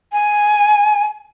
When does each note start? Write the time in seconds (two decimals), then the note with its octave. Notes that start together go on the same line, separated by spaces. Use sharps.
0.13 G#5